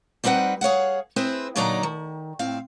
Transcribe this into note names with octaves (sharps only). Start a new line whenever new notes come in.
G3 C4 D#4 B4 F#5
G#4 C#5 F5 F#5
C4 E4 G#4 B4 C5
A#2 D3 F#3 D#4 D5 A#5
D#3
A2 C4 F5